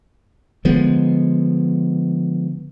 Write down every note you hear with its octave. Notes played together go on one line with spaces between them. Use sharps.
D3 F3 G#3 B3